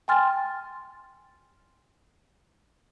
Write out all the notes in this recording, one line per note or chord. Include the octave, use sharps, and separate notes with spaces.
G5 G#5 C6 F6 A6